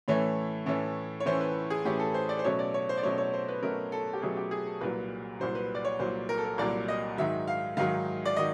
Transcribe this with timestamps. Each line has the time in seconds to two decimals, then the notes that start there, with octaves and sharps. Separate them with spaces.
0.08 A2 E3 A3 C#4 C#5
0.66 A2 E3 A3 C#4
1.20 C#5
1.26 A2 E3 A3 C#4 C5
1.41 B4
1.70 G#4
1.85 A2 E3 A3 C#4 G4
2.00 A4
2.14 C5
2.29 D5
2.39 C5
2.44 B2 F#3 A3 C#4 C#5
2.59 D5
2.74 C#5
2.89 C5
2.97 D5
3.03 B2 F#3 A3 C#4 C#5
3.18 C#5
3.33 C5
3.48 B4
3.62 B2 F#3 A3 C#4 A#4
3.92 A4
4.13 G4
4.22 B2 F#3 A3 C#4 G#4
4.37 G4
4.51 G#4
4.66 A4
4.81 C2 A#2 F#3 B4
5.40 C2 A#2 F#3 C5
5.55 B4
5.75 D5
5.85 C#5
5.99 C2 A#2 F#3 C5
6.29 A#4
6.38 A4
6.45 A#4
6.58 C2 A#2 F#3 D5
6.88 D#5
7.17 G#2 D#3 F#3 E5
7.47 F5
7.77 G#2 D#3 F#3 F5
8.25 D5
8.36 D#3 F#3 D#5